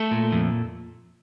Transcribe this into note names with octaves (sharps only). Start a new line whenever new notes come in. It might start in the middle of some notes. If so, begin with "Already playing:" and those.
Already playing: A3 A4
A#2
F2